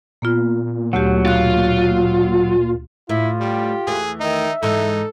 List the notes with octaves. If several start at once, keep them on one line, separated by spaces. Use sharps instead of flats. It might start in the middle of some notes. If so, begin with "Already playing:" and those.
A#2 A#3 B3 F4
D2 F#3 A3 G4
B2 F4 F#6
A2 E4 F4
G3 G4
E2 E3 A3 G#4
D#3 D#4 E5
G#2 E3 D#4 A4